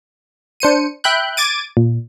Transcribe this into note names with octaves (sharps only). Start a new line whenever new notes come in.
D4 C5 C#7 D#7
E5 G5 B5 F#6 G6
D6 G#6 A6 D7 D#7
A#2